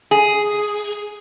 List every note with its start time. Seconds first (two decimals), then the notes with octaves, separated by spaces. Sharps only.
0.11 G#4